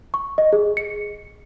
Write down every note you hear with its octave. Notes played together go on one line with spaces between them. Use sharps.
C#6
D#5
G#4
C#7